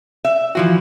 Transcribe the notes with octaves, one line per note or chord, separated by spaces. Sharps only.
E5
E3 F3 F#4